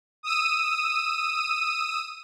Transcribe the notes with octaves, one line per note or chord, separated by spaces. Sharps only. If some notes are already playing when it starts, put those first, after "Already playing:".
D#6 E6 D#7